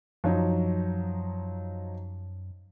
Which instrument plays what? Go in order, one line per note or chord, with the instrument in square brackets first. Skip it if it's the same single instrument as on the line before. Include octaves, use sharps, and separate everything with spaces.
[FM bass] F#2 [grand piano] F3 F#3 D#4